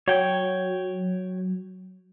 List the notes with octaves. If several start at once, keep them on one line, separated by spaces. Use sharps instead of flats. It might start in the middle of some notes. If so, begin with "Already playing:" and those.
F#3 C#5 G5